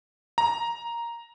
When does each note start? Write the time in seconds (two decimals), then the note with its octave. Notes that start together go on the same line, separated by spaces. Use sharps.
0.38 A#5